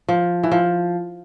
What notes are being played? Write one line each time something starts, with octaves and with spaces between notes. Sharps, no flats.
F3
E3
F3